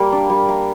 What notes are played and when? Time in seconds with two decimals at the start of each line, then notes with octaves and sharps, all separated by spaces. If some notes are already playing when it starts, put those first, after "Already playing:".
Already playing: G3 A#3
0.12 D4
0.30 G3
0.49 A#3